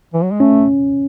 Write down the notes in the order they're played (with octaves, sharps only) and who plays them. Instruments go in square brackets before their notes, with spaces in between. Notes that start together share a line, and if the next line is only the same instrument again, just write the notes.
[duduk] E3
F#3
G#3
[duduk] A3 [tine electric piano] C#4